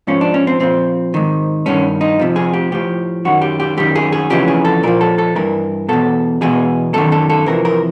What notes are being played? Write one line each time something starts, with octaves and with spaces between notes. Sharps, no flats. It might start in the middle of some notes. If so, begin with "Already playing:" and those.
G#2 F3 C#4
D4
C#4
C4
A#2 F3 C4
G#2 D#3
G2 D#3 C#4
D#4
F2 C3 F3
G#4
G4
A2 F3 G4
F#2 D#3 F#4
G4
G4
F#2 D#3 G4
G#4
G#4
F2 C#3 E3 G4
G#4
A4
A#2 F3 A#4
A4
A4
G2 E3 A#4
E2 B2 A4
E2 B2 G#4
F#2 D#3 A4
A4
A4
F2 C3 E3 A#4
A#4